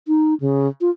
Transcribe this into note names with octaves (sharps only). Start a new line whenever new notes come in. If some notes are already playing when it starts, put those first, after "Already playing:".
D#4
C#3
F4